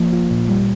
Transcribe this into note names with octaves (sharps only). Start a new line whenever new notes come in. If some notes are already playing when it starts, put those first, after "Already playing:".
Already playing: F3 A#3
F4
A#2
G3